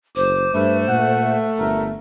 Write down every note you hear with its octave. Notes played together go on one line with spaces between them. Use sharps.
F#1 C5 D6
G2 A3 B4
A#2 F#5
G1 A#4